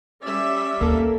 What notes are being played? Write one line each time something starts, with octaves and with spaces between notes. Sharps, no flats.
G3 C#4 D5 E5
D#2 A#3 A4